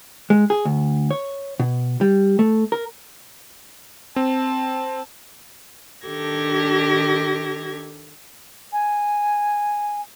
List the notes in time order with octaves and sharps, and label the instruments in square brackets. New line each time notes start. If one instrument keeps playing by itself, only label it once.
[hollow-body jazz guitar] G#3
G#4
D2
C#5
B2
G3
A3
A#4
[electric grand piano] C4 [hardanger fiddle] A5
[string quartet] D#3 D4 G4 A4 G#6 A#6
[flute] G#5